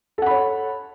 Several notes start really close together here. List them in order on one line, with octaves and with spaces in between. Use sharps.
A4 F#5 B5 C#5